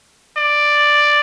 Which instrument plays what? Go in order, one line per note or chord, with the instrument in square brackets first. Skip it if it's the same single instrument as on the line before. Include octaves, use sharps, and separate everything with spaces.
[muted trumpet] D5